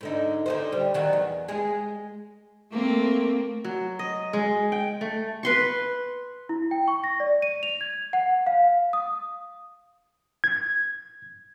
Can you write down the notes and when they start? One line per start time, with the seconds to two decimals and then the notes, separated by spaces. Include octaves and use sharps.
0.01 G#2 D3 D#4
0.46 D3 D#4 C5
0.72 G3
0.94 D#3 F#3 D5
1.13 E2
1.48 G#3 G#4
2.70 A3 A#3 C4
3.65 F#3
3.99 D#5
4.33 G#3
4.72 G5
5.01 A3
5.43 B4 C6 C#6
6.49 E4
6.71 G5
6.88 C#6
7.04 A#6
7.20 D5
7.42 D#7
7.63 F7
7.81 G#6
8.13 F#5
8.47 F5
8.93 D#6
10.44 G#6